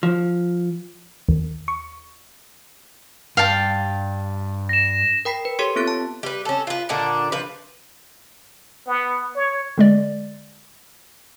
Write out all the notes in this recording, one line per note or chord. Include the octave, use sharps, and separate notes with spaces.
F3
D#2
C#6
G2 F5 G5 A5
A#6 E7
A#4 G5 B5 B6 C7
B4
G4 A4 C#5 C6 B6 C#7
B3 C4 F4 A4 F#6 A6
A5
G3 B4
C#4 A4
F4 B4
A#2 D3 D4 F#5
F3 B4
B3
C#5
D3 G#3 D5